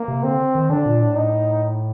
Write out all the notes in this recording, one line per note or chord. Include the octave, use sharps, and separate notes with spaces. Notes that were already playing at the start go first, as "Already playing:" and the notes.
Already playing: A#3
C3
D3 C4
D#3
D3 D4
A#2
A2
D#4